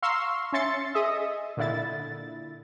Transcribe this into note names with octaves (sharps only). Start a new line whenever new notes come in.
F5 A#5 C6 C#6 E6
C#4 E5 C6 A6 C#7
G#4 D#5 E5
A#2 D3 E4 A6